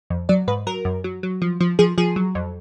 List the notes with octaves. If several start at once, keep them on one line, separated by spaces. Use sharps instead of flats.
F2
F#3 D5
G#2 B4
F#3 A#4
F#2
F#3
F#3
F3
F3
F3 G#4
F3 G#4
F#3
F2